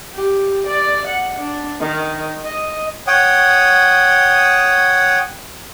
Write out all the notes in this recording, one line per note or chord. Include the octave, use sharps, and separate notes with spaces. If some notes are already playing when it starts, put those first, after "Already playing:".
G4
D5
F#5
D4
D#3
D#5
C#5 F#5 G5 D#6